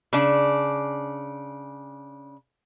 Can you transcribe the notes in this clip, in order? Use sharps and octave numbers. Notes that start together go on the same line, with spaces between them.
C#3 D4